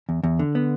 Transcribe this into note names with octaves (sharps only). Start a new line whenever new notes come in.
E2
E2
D3
B3